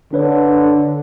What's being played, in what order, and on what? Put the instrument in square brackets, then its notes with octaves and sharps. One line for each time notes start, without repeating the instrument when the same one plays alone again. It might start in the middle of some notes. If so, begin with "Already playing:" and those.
[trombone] D3 [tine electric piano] D4 B4 C#5